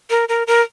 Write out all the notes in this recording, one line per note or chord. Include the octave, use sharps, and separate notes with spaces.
A#4
A#4
A#4